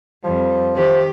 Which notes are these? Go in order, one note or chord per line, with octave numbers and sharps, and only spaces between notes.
F2 F3 G3
D#3 G4 C5